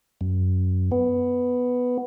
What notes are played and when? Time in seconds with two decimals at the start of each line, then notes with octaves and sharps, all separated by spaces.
0.21 F#2
0.92 B3